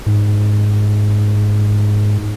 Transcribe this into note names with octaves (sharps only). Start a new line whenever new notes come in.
G#2